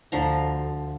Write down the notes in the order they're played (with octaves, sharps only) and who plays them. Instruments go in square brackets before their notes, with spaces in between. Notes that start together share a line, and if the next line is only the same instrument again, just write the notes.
[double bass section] D2 [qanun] D3 F3 A#5